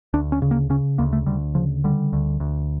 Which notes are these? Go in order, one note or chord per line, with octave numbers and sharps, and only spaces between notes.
D2 D4
C#4
C#3
A#3
C#3 C#4
D2 A#3
A3
D2 G3
C#3 F3
D3 G3
D2
D2